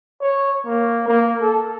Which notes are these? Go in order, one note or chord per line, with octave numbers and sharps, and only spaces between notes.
C#5
A#3
A#3
A4